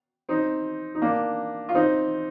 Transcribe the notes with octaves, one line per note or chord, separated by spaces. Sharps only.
C4 D#4
D#4
A#3 D4
F4
C4 D#4